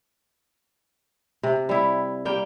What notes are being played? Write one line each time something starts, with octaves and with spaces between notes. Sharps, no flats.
C3
G3 E4
G3 A#3 G5